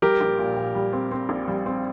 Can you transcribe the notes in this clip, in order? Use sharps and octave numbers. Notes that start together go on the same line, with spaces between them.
G3 G4 A#4
A#1
A#2
A#2
G3
C4
C4
A#1
G3
C4